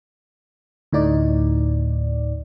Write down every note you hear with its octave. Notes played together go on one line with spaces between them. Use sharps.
D2 A2 D#4 D5